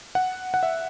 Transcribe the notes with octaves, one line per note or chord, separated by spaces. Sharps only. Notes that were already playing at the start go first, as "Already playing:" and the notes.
F#5
F#5
E5